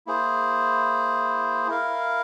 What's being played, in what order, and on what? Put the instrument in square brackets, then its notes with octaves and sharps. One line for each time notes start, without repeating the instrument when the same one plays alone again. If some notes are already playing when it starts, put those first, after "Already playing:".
[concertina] A#3 E4 G#4 C5
E4 A#4 F5